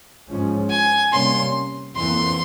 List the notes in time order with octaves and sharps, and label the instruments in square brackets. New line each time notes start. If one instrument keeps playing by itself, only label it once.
[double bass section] G#2 F3 G#3 C#4
[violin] G#5
[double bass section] C3 G3 A#3 C#4 [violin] C6
[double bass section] F2 E3 A#3 [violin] C6